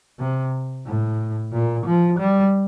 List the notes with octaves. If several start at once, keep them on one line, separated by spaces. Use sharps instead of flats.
C3
A2
A#2
F3
G3